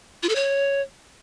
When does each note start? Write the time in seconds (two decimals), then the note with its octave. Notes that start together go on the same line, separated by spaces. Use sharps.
0.23 F4
0.29 A4
0.35 C#5